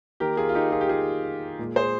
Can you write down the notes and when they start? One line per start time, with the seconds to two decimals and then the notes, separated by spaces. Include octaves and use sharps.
0.20 D#3 A#3 G4 A#4
0.37 F4 G#4
0.49 F4
0.55 D#4 G4
0.72 F4 G#4
0.81 G4
0.89 F4 G#4
1.59 A#2 G#3
1.76 G#4 C5